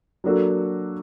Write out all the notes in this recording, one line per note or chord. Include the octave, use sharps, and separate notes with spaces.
F#3 A#3 D4 F#4 A4